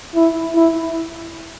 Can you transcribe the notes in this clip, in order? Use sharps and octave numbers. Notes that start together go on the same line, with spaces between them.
E4
E4